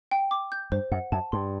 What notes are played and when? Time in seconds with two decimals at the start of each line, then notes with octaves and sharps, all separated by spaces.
0.11 G5
0.31 D6
0.52 G6
0.72 G2 C5
0.91 F#2 F#5
1.12 F#2 A5
1.32 G2 C6